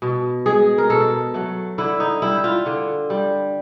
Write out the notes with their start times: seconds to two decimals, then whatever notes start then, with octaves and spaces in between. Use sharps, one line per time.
0.02 B2
0.46 G#3 G#4
0.78 A#4
0.90 B2 A4
1.34 F#3 A3
1.78 D3 E4
2.00 D#4
2.22 G3 E4
2.44 F4
2.66 D3
3.10 G3